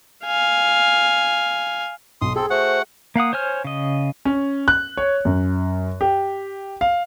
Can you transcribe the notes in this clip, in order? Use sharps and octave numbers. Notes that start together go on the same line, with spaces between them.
F5 G#5
B1 C6 D#6
C4 G#4 A4
A3 F#4 C5 F#5
A#3 F5 F#5 D#6
C5 C#5 G#5 F6
C#3 D#5
C#4
F#6
C#5
F#2
G4
F5